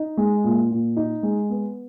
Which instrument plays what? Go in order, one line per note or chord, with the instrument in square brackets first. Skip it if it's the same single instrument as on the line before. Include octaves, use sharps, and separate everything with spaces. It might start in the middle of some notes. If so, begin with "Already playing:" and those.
Already playing: [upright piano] D#4
G#3
A#2
A#2
D#4
G#3
B3